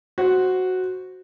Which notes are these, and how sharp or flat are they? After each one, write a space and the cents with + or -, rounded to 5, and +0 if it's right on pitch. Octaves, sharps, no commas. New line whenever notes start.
F#4 +0 C5 +0